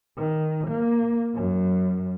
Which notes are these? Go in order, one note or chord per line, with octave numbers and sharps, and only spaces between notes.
D#3
A#3
F#2